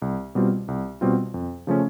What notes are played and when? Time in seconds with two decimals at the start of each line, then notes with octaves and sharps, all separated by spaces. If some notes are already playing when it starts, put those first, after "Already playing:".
0.02 C2
0.35 B2 G3 C4 F4
0.68 C2
1.01 B2 G3 C4 F4
1.34 F2
1.67 C#3 F3 A3 C#4